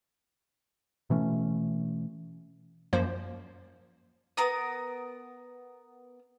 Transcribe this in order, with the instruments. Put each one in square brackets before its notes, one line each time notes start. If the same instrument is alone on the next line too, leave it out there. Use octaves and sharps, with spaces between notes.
[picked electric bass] B2 E3 A3 C#4
[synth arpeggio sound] F#2 F3 A#3 C5
[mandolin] B3 A#4 D#6